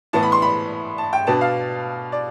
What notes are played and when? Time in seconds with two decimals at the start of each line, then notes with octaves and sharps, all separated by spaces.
0.13 A2 E3 B3 A5
0.23 B5
0.32 C6
0.42 B5
0.98 A5
1.13 G5
1.27 B2 B3 D4 A5
1.41 F5
2.12 D5